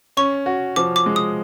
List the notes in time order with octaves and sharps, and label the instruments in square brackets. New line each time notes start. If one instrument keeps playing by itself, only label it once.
[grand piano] C#4 [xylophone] C#6
[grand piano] F#4
[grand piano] F3 [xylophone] D6
[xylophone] D6
[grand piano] G#3
[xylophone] D#6